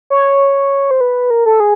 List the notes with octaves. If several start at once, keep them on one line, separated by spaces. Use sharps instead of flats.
C#5
C5
B4
A#4
A4
G#4